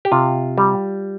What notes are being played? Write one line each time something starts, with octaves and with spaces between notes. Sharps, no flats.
G4
C3 F4
G3